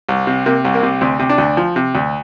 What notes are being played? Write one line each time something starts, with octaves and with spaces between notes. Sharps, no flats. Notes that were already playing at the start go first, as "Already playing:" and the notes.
C2
C3
C3 A#3
C2
A#3
C3
D2 C4
C3
D4
D2
F3
C3
D2